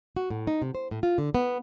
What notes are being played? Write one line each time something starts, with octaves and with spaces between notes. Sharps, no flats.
F#4
A2
D#4
C3
C5
A2
F4
D3
B3